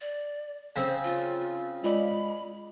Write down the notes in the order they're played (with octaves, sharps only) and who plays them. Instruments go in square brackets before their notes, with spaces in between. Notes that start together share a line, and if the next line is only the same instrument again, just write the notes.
[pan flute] D5
[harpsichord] C#3 C4 [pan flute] C5
[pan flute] F4
[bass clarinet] G#3 [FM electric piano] F4 D5 [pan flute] B5